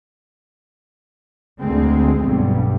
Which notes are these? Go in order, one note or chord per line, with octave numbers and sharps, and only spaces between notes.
D2 G#3 C4
B1 G2